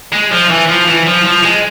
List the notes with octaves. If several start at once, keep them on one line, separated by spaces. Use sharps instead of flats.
G#3
F3
E3
F3
E3
F3
F3
G#3